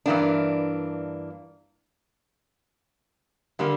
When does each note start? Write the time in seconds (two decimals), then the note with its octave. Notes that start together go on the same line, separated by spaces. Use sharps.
0.06 G2 E3 A#3 D4
3.59 D3 G3 A#3